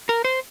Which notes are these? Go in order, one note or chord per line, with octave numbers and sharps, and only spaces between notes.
A#4
C5